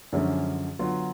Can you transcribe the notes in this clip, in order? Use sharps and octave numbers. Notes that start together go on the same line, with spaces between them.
F#2 D3 F3 G#3 C#4
D3 F#3 B3 F4